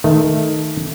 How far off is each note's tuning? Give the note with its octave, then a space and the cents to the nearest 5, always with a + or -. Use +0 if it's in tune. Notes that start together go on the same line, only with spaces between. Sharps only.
D#3 +0 A3 +0